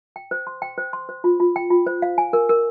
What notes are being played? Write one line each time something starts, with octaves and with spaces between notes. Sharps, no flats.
G5
C5
C6
G5
C5
C6
C5
F4
F4
G5
F4
C5
F5
G#5
A#4
A#4